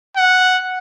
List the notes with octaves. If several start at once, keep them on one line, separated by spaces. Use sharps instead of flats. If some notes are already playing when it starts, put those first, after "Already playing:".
F#5